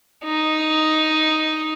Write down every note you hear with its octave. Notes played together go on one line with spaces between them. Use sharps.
D#4